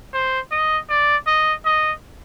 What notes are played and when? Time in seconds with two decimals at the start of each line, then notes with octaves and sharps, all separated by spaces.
0.13 C5
0.52 D#5
0.90 D5
1.27 D#5
1.66 D#5